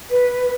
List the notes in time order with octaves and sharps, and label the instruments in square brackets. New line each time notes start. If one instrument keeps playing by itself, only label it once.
[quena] B4